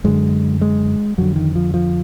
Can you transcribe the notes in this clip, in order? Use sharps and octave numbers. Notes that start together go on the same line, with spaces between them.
F#2 D3 G#3
G#3
F2 D3 F#3
D#3
F3
F3